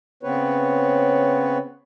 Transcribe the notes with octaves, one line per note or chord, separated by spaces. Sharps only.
C#3 B3 C4 B4 C#5